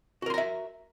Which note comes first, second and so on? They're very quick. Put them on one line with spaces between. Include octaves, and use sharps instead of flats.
F#4 A#4 C6 A#5 E5